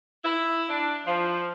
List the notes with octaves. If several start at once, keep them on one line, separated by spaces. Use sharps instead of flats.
E4
D4
F3